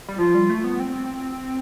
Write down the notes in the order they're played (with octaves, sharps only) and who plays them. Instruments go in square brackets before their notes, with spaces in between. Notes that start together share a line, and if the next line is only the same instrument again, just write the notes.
[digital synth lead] G3
[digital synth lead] F3 [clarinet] F4
[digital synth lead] G3
A3
B3
C4